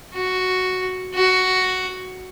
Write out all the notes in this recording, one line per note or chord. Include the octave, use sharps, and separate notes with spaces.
F#4
F#4